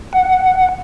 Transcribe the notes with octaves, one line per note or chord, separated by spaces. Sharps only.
F#5